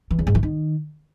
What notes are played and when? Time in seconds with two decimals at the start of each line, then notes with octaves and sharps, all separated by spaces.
0.11 E3
0.19 E2
0.27 G#2
0.35 E3
0.43 D#3